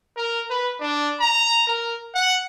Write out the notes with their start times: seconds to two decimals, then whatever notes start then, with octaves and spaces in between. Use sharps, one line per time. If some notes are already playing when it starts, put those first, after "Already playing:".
0.17 A#4
0.50 B4
0.81 D4
1.21 A#5
1.67 A#4
2.15 F#5